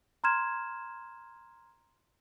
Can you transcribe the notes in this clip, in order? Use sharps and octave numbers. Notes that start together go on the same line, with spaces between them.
A#5 C6 F6 G#6 E7